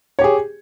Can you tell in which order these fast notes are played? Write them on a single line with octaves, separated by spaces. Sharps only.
C#5 G4 G#4